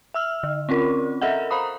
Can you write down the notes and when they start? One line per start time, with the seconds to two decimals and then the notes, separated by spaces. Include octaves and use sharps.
0.14 E5 E6 F6
0.43 D3
0.69 C4 C#4 F4 A#4
1.21 A4 A#4 D#5 E5 F#5
1.51 C5 F5 A#5 B5 D#6